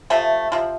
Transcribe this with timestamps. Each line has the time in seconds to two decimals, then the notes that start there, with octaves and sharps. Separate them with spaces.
0.10 C3 F3 A3
0.52 C3 F3